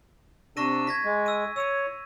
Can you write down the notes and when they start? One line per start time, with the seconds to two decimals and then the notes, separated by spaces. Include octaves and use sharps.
0.57 C3 D4 C#6 E6 A#6 D#7
0.87 G#6 A#6 B6
1.04 G#3
1.26 E6 D#7
1.56 C#5 E6 D#7